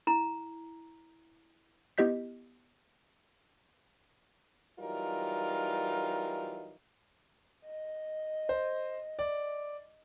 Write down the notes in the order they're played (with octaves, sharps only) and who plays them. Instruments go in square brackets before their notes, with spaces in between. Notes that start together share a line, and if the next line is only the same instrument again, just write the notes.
[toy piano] E4 A#5
[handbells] B3 E4 G4 D#5 G6 B6
[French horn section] E3 F#3 G3 D#4 F4 A#4
[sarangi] D#5
[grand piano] C5
D5